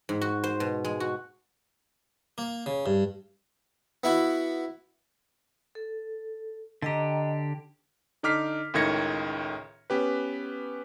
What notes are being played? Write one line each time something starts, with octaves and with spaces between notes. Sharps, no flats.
G#2
F#4
C5
B2
G#3
F#4
A#3
C#3
G2
B3 E4 F#4
A4
D3 G4 D#5 G5 A#5
D3 D#4 D6 F6 B6 C7
C#2 A2 D#3 G#6 A#6 C#7
B3 C#4 G4 B4